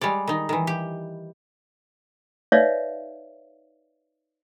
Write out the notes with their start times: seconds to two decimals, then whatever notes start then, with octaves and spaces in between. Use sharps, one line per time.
0.01 G3 G#3 C#5 D5
0.27 D#3 D#4
0.49 D#3 E3
0.67 G4
2.52 D#4 B4 C#5 D5 E5 F5